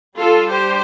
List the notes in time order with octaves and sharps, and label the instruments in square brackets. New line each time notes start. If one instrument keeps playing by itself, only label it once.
[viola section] G3 D4 F4 A4
G4 C5